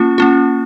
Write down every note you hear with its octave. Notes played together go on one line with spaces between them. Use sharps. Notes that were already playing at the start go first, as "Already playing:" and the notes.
Already playing: A#3 C#4 F4
A#3 C#4 F4